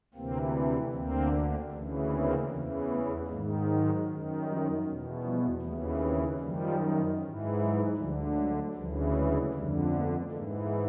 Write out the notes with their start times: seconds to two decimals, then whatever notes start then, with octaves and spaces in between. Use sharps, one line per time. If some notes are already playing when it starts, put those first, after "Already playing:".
0.14 D2 C3 E3 A#3 C4
0.92 D2 D3 A#3 C4
1.71 D2 C#3 E3
2.10 A#3 C4
2.49 E2 C#3 E3
2.88 A3 B3
3.27 G#2 D#3 G#3 A#3
3.67 F#3 G#3
4.05 F#2 D#3
4.44 F3 G3
4.84 E2 B2
5.22 F3 G3
5.61 D#2 C#3 E3 A3 B3
6.01 A#3 C4
6.39 F#2 D#3 F3 G3
7.18 G#2 E3
7.57 F#3
7.96 D2 D3 F3 G3
8.35 F#3 G#3
8.74 D2 C#3 E3 F3 G3
9.13 F#3 G#3
9.52 F2 D3 G3 A3
9.91 A3 B3
10.31 G#2 E3 G#3 A#3